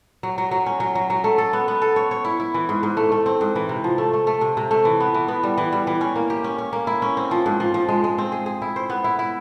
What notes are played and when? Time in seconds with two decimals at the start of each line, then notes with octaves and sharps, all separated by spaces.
0.23 F#3
0.38 F#3
0.51 F#3
0.66 C#4
0.80 F#3
0.95 F#3
1.10 F#3
1.24 A3
1.38 A4
1.53 B3
1.68 B3
1.82 A4
1.96 C#5
2.11 C#5
2.25 E4
2.40 E4
2.54 E3
2.69 G#2
2.83 G#2
2.97 A3
3.12 A3
3.26 C4
3.41 G#2
3.56 E3
3.69 C3
3.84 F3
3.98 A3
4.14 A3
4.27 A3
4.41 C3
4.57 C3
4.71 A3
4.85 E3
5.00 B3
5.14 E3
5.28 B3
5.43 G3
5.58 E3
5.72 G3
5.87 E3
6.01 C#4
6.16 A#3
6.30 G4
6.44 C#4
6.58 C#4
6.73 A#3
6.87 E4
7.02 C#4
7.17 C4
7.31 F3
7.46 G#2
7.60 F3
7.74 F3
7.89 G#3
8.04 G#3
8.18 C4
8.32 G#4
8.46 G#4
8.62 E4
8.76 C5
8.90 B3
9.04 E4
9.19 E4